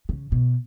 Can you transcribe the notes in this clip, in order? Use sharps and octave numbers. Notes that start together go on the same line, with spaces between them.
C#3
B2